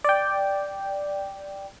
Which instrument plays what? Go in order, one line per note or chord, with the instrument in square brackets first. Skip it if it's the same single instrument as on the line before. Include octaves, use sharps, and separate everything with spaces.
[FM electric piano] D5 G5